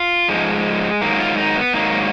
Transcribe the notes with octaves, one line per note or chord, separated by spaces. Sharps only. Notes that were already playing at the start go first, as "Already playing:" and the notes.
Already playing: F4
G#2 F3 G#3
G#2 D#3 F#3 A#3
F4
D#4
B3
G#2 D#3 F#3 A#3